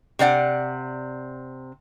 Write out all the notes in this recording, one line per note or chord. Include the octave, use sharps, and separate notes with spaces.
C3 C4 D5 F#5